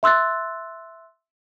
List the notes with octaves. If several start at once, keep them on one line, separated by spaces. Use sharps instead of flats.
E5 C6 E6 F#6 A6